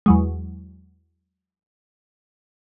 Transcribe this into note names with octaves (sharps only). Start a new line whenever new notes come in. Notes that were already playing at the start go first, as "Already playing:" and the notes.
E2 F#3 G#3